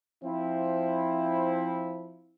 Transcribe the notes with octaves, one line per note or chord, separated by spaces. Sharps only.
F3 C4 E4